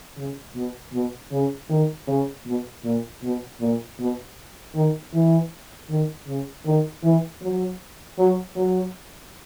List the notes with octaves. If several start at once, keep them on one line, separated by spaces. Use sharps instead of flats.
C#3
B2
B2
C#3
D#3
C#3
B2
A#2
B2
A#2
B2
D#3
E3
D#3
C#3
D#3
E3
F#3
F#3
F#3